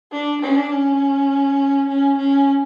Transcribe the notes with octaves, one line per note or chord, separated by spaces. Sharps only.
D4
D4
C#4
C#4
C#4